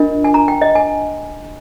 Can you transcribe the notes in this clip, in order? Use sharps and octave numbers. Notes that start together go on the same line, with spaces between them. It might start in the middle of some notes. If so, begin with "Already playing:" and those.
Already playing: D4 F4 A#4 D#5
G#5
A#5
G5
D#5
G#5